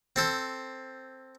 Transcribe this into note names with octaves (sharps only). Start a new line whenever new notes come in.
C4 A4 C5